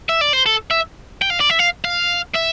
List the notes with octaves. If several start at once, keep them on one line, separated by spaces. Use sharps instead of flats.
E5
D5
C5
A4
E5
G5
F5
D5
E5
F5
F5
E5